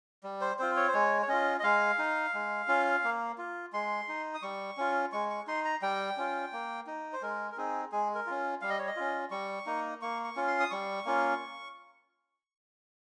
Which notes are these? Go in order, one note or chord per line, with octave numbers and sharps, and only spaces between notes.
G3
C5
C4 F4 C5
C#5
C5
G#3 C#5
C#5
C#4 F4 D#5
D#5
G#3 F5
D#4
G#3
C#4 F4
A#3
F4
G#3 C6
D#4
D#6
G3 C#6
C#4 F4
G#3 C#6
C#6
D#4 C6
A#5
G3 G5
C#4 F4
A#3
D#4
C5
G#3 A#4
A#4
C4 D#4 G#4
G#3 G#4
A#4
C#4 F4
G3 F5
D#5
C#5
D#5
C#4 F4
G3 C#6
A#3 D#4
A#3 C#6
C#6
C#4 F4
C6
D#6
G3 C#6
A#3 C#4 F4